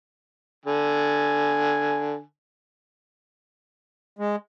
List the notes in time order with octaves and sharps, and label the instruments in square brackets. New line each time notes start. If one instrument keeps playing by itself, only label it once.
[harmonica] D3 G#5
[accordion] G#3